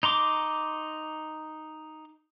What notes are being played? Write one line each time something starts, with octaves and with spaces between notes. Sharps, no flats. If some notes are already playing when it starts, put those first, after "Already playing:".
D#4 A#5 C6 D6